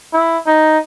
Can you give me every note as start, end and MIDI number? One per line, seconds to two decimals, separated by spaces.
0.13 0.38 64
0.47 0.78 63